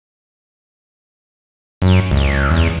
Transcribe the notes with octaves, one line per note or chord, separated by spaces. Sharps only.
F#2
C#2
E2